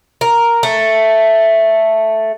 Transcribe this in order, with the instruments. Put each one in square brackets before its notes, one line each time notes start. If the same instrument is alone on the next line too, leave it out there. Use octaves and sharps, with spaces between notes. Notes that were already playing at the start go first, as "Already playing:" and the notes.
[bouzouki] A#4
A3